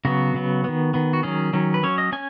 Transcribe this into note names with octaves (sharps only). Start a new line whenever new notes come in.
C#3 F#3 B3 F#4
C#3 F#3 B3
D#3 B3
D#3 B3
F#4
D#3 F#3 C#4 G#4
D#3 F#3 C#4
B4
F#3 C#4 C#5
D#5
C#4 G#5